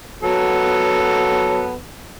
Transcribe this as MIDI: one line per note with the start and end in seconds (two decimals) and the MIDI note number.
0.23 1.75 54
0.23 1.75 59
0.23 1.75 69